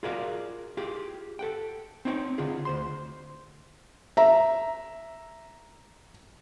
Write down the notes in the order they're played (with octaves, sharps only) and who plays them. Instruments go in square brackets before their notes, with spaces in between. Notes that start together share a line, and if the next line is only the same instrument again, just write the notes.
[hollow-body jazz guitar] F4 F#4 G#4 A#4 D5 F5
F4 G4 G#4
A4 F#5 G5
C4 D#4 C#5 G5
D3 F4 G#4
D2 C5 C6
[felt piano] E5 A#5